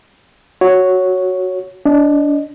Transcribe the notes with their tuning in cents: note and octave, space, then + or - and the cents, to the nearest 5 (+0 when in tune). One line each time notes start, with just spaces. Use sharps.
F#4 +0 C#5 +0
D4 -25 D#5 -15